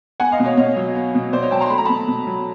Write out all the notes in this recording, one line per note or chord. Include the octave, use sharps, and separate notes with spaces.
B3 F#5 G#5
D#5 F5
B2
C#5 D#5
B2 C#5 D#5
F#3
B3
B2
B2 C5 D5
C#5 D#5
F#3 G5 A5
A#5 C6
A3 B5
A#5
B2 A5 B5
B2
F#3